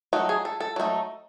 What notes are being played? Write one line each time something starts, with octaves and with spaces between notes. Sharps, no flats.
F#3 A3 D#4 F#4
G#4
A4
A4
F#3 A3 D#4